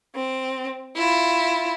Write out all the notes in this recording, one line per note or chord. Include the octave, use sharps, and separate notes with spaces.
C4
E4 F4